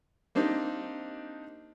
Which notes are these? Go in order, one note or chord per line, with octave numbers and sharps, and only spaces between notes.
A#3 C4 D4 D#4 G4